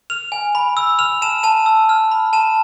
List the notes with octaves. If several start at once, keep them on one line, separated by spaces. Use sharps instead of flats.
F6 F7
G#5
B5
E6
F6 F7
A5 E7
A5 E7
E6
F6
B5
A5 E7